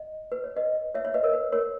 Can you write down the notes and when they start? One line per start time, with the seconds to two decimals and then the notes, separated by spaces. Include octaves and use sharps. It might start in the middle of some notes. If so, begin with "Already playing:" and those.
Already playing: D#5
0.32 B4
0.44 C#5
0.57 B4 D#5
0.95 C#5 E5
1.05 C#5 E5
1.14 B4 D#5
1.23 A#4 C#5
1.33 B4
1.52 A#4 C#5